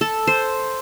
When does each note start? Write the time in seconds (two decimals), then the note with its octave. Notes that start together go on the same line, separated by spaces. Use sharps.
0.01 A4
0.27 C5